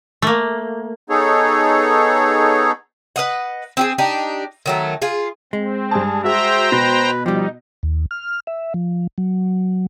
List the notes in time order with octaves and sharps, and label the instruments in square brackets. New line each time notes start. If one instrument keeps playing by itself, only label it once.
[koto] A3 A#3
[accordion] B3 D#4 G#4 A4 C#5
[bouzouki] B4 D#5 F#5
C4 G4 G#4
D4 D#4 G4
D#3 F#3 A3
F4 G#4
[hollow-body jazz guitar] G#3 [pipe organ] C4
[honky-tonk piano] G2 A5 [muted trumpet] G#4
[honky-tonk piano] F#4 G#4 [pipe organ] C5 G5 A#5 [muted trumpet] E5
[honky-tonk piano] B2 A#6 [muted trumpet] B4
[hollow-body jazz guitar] F3 G3 [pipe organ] D#4 [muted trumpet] G4
[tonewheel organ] D#2
F6
E5
F3
F#3